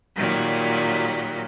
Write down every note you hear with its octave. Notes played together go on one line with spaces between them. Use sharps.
A#2 D#3 F#3 G3